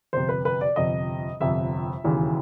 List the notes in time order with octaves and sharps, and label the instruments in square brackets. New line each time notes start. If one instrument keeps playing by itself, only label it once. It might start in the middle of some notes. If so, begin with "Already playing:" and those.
[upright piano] G1 F2 C3 C5
B4
B4
D5
G1 F2 C3 D#5
G1 F2 C3 E5
E1 D#2 C#3 E3